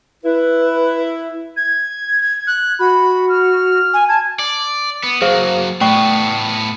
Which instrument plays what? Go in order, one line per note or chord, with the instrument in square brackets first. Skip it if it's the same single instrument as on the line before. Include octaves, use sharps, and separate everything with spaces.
[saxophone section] E4 [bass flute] B4
[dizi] G#6
[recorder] F#6
[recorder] F#4 [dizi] B5
[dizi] F6
[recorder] G#5
[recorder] A5 [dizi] G#6
[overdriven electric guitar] D5
B3
[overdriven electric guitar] F#3 A#3 [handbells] G#4 C5 F5
[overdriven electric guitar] A2 B3 [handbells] A3 G5 C#6